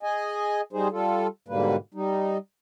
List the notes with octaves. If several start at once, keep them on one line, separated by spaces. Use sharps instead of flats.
G#4 D#5 G#5
G3 D#4 G#4 C5
G3 F4 A4
G#2 B2 D3 G3 A#3 B4
G3 D#4